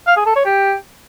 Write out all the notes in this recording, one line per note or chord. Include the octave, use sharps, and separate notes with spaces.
F5
G#4
A4
C#5
G4